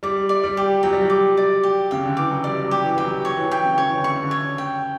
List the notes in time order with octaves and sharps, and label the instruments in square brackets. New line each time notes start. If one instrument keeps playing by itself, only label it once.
[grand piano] G3 [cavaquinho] D6
[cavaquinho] D5
[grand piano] G3
[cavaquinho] G4
[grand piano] F#3 [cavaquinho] G5
[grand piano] G3
F#3
[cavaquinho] D6
D5
G4
[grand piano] C#3 [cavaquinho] G5
[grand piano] D3
[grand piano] E3 [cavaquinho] D6
[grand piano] F#3
[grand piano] G3 [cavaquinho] D5
[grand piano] F#3
[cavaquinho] G4
[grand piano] E3
[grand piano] E3 [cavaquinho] G5
[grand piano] F#3
[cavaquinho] C#5
[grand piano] E3
F#3
[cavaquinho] G5
[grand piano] C#3
[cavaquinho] C#5
[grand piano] E3
D3
[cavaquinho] C#6
[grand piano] C#3
D3
[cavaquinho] C#5
G5